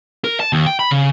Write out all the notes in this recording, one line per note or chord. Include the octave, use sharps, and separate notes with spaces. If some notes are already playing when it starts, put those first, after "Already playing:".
A#4
A5
D#2
G5
B5
C#3